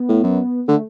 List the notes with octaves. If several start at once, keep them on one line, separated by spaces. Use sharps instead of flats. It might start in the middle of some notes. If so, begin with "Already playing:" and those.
Already playing: B3
A2
F#2
D3 A3